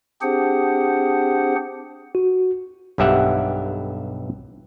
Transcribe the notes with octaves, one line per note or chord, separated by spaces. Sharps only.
C4 D4 G4 G#4 C5 F#5
F#4
B1 G2 G4 E5 F#5